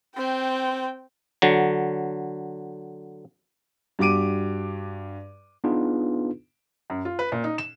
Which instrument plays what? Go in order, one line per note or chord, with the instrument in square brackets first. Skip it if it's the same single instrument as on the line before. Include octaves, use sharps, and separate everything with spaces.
[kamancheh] C4 G5
[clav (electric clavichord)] D3 F#3
[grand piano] G2 F#4 G4 D6 D7 D#7
[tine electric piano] B3 D4 D#4 F4 G#4 B4
[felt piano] F#2
F4
B4
A#2
D#4
E7